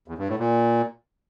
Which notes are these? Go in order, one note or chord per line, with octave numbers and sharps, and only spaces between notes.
E2
G2
A2
A#2